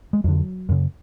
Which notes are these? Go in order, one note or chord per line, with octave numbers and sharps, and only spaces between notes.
G#3
F2 D3 F#3
F#2 C#3